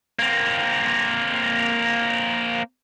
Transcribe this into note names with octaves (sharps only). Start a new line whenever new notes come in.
A#3 C4